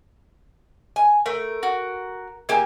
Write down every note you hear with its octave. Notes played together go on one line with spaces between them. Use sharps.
G#5
A3 A#4
F#4
A#3 G4 E5 G#5